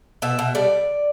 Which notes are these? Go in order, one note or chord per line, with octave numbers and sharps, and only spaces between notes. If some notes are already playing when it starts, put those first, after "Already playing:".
B2 E5
B2
G3 D5